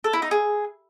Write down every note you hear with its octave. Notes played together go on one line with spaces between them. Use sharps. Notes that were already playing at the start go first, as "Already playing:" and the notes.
A4
E4
D#4
G#4